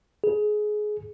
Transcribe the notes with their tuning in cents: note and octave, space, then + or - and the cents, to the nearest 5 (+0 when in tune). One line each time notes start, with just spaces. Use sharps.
G#4 +20